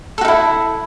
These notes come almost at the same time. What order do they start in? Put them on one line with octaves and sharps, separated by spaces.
A4 F#4 D#4 E4